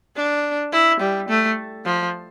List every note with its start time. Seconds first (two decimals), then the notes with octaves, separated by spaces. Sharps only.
0.16 D4
0.73 E4
1.00 G3
1.28 A3
1.85 F3